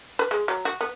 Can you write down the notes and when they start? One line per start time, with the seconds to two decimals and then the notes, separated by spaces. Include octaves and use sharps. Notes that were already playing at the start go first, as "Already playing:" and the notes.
0.19 B4
0.31 G#3
0.48 F#3
0.65 F#4
0.81 B3